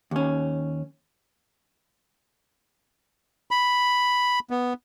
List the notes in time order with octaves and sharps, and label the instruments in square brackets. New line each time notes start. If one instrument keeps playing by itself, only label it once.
[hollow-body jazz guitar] D#2 C#4
[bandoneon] B5
B3